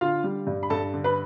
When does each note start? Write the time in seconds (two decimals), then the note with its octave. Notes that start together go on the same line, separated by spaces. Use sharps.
0.01 D3 F4 F5
0.24 G3
0.47 G2
0.63 B5
0.70 G2 A4 A5
0.94 D3
1.04 B4 B5